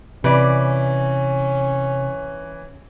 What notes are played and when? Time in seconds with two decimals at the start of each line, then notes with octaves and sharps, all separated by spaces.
0.24 C3 E3 C#4 B4 D5